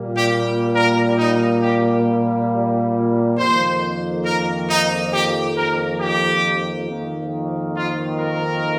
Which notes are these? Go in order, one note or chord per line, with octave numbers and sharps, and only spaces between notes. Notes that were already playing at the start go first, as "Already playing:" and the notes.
Already playing: A#2 G3 A#3
G4
A#4
D#4
G4
F2 D#3 A#3 C5
A#4
D#4
G4
A#4
G4
F2 D#3 A#3
F4
A#4